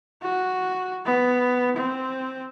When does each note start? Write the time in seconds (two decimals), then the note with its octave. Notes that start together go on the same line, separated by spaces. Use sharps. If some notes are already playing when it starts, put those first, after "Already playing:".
0.22 F#4
1.06 B3
1.76 C4